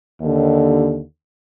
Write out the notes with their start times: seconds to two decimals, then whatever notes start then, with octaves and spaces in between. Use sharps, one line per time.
0.20 D#2 D3